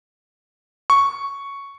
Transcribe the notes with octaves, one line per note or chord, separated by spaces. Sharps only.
C#6